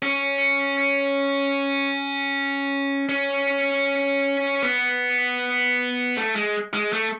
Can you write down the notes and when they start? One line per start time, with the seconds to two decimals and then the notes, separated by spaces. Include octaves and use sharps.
0.03 C#4
3.09 C#4
4.63 B3
6.17 A3
6.36 G#3
6.74 G#3
6.93 A3